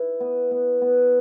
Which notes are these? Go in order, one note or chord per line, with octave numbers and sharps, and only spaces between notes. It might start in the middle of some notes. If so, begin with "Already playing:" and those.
Already playing: E4 B4
B3
B3
B3